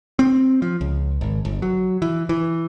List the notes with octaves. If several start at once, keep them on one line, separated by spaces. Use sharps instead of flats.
C4
F3
C#2
G#1
G1
F#3
E3
E3